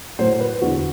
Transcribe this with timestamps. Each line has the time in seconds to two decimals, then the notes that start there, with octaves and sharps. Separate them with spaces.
0.19 A2 F#3 C5
0.40 B4
0.62 E2 D3 F#3 F#4